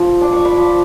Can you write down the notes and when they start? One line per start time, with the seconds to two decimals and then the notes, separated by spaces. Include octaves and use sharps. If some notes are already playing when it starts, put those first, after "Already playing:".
Already playing: F3
0.21 D4 D6
0.33 C#6
0.45 B5 D6
0.58 F3